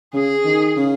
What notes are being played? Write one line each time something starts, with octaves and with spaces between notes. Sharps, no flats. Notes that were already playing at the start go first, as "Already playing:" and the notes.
C#3 G#4
D#3
C#3